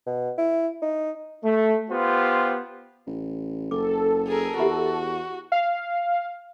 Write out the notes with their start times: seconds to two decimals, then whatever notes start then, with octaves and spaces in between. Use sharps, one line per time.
0.06 B2
0.38 E4
0.82 D#4
1.44 A3
1.90 B3 F4 G4 C5
3.07 A1
3.71 F#1 A4 D6
4.27 G#4 A#4
4.58 E2 F#4 G4 E5 B5
5.52 F5